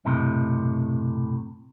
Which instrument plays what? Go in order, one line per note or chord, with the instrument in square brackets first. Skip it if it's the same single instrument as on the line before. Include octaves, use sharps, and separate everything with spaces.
[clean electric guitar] B1 F#2 A2 C3